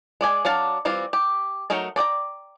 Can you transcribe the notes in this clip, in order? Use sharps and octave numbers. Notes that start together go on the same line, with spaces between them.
G#3 D5 G#5
F#3 D4 F5 A5
E3 G3 C4 F4
G4
F#3 A3 D#4 A#4
D4 D5 G5 A#5